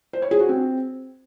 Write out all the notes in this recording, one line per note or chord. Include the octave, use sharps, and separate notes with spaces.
C5
C#5
G#4
F#4
C4